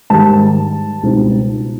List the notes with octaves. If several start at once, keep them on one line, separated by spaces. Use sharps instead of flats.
G#2 D#3 G3 A5
C#2 B2 G3 C4 D#4